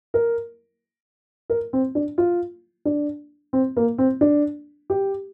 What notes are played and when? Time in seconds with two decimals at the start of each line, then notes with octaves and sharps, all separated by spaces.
0.14 A#4
1.50 A#4
1.73 C4
1.95 D4
2.18 F4
2.85 D4
3.53 C4
3.77 A#3
3.98 C4
4.21 D4
4.90 G4